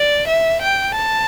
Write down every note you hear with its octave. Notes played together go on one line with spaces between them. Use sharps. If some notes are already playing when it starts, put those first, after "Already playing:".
Already playing: D5
E5
G5
A5